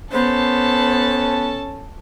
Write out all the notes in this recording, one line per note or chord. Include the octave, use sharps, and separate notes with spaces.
B3 C#4 A4 C5 A5